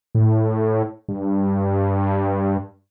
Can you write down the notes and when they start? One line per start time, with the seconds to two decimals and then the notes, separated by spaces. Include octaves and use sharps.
0.15 A2
1.09 G2